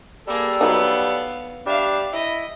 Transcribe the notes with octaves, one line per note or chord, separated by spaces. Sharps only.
G3 A#3 G#4 A4
F#3 B3 D#4 F5
G3 D4 E5 F5
E4 D#5 B5